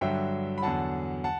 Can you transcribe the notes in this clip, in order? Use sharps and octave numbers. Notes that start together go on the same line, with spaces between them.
G2 D3 F#3 E5 G5
B5
E2 D3 F#3 F#5 A5
F#5 A5